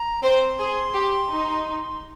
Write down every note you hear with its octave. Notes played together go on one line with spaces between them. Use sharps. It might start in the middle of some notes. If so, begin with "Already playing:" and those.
Already playing: A#5
C4 C5 C6
G#4
G4
D#4